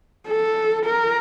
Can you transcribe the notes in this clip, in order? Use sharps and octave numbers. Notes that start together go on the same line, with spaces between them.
A4
A#4